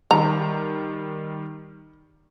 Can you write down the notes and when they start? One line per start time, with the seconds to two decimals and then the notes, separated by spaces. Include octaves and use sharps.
0.11 D#3 G3 A#5